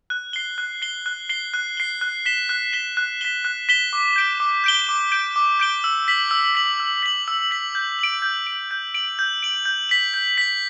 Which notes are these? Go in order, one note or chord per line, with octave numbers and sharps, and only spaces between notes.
F#6
C7 G7
F#6
C7 G7
F#6
C7 G7
F#6
C7 G7
F#6
B6 E7 G7
F#6
B6 E7 G7
F#6
B6 E7 G7
F#6
B6 E7 G7
D6
G6 D7 G7
D6
G6 D7 G7
D6
G6 D7 G7
D6
G6 D7 G7
E6
B6 F#7
E6
B6 F#7
E6
B6 F#7
E6
B6 F#7
G6
D7 F#7
G6
D7 F#7
G6
D7 F#7
G6
D7 F#7
G6
B6 F#7
G6
B6 F#7